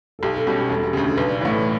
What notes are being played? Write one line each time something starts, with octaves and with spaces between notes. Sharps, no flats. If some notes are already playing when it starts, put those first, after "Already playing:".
A4
B1 G4
A4
B2 G3 C#4 F#4
G4
E1 A4
F#4
D2 C#3 G4
A4
B1 B4
D5
A2 E3 A4 C#5
B4